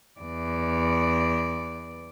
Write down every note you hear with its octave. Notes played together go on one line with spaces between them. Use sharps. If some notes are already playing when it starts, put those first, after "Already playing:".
E2 D5